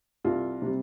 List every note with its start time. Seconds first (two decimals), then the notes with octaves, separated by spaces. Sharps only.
0.24 C2 F4
0.62 C3 G3